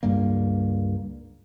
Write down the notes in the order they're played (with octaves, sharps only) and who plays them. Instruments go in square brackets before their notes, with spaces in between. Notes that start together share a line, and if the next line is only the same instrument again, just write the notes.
[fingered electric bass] C#2 G2 G3 A#3